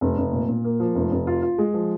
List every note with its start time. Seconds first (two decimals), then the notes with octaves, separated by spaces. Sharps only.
0.01 F1
0.17 F1
0.33 A#2
0.49 A#2
0.64 A#3
0.80 F3
0.95 F1
1.11 F1
1.27 F4
1.43 F4
1.58 G#3
1.74 F3